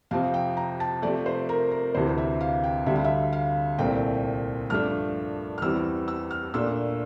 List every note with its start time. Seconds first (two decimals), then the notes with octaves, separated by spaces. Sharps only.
0.11 F2 C3 F3 C4 F5
0.34 G5
0.57 A#5
0.80 A5
1.02 C3 F3 A3 D5
1.26 C5
1.49 A#4
1.71 A#4
1.95 D2 C3 E3 C5
2.18 E5
2.41 F5
2.63 G5
2.86 D2 D3 G3 E5
2.96 F5
3.04 E5
3.33 F5
3.78 C2 A#2 A3 C4 G5
4.70 G2 F3 A3 D4 F6
5.58 F6
5.62 E2 E3 G3 C4 E6
6.08 E6
6.31 F6
6.54 A#2 A3 D4 E6